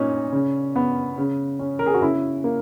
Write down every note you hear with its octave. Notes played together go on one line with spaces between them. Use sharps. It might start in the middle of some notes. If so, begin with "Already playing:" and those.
Already playing: A#2 C#4 D#4
C#3
B3
C#3
C#4
A#4
G#4
F#4
C#3 E4
A#3